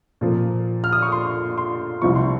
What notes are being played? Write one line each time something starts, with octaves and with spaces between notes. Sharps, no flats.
A#2 F3 A#3
F6
D#6
C#6
C6
C6
C2 C3 F3 C#6
C6